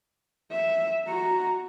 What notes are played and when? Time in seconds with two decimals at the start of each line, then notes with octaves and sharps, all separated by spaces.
0.52 E5
1.08 F#4 A#5